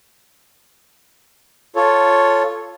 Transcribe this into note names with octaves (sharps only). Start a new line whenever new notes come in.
F4 A4 C#5